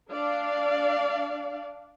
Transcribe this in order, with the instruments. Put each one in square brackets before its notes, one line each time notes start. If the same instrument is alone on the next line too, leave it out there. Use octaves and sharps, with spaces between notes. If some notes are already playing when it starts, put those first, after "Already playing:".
[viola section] D4 D5 F5